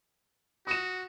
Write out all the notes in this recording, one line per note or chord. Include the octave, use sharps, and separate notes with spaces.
F#4 D#6 A#6 E7